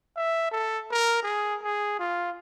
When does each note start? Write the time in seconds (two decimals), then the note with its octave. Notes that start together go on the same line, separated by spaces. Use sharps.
0.16 E5
0.52 A4
0.91 A#4
1.23 G#4
1.63 G#4
1.99 F4